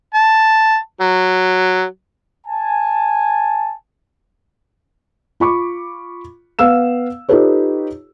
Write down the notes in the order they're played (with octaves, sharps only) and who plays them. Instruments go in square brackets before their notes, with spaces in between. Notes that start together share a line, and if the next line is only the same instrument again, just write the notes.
[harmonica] A5
F#3
[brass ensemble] G#5 A5
[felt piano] F4 B5 C#6 D6
B3 F5 E6 E7
D#4 F4 G4 A4 B4 C#5